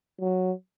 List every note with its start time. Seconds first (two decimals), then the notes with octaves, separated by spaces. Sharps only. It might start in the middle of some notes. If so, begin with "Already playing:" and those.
0.21 F#3